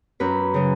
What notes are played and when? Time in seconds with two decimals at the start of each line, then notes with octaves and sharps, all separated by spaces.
0.20 F#2 B4
0.54 C#3 F#3